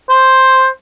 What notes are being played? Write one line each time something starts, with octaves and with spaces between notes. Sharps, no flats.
C5